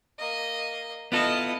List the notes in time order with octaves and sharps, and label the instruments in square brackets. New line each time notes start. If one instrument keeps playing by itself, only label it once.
[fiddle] A#3 D#5
[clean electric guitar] B3 F4 A4 [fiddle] E4 D#5